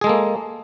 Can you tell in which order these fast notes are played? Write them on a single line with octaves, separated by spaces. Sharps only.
G#4 G#3 A4 A#3